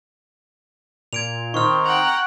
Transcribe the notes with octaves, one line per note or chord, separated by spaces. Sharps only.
A#2 G#6 D7 F7
D#3 C4 D#4 C#6 F6
F#5 G5 A#5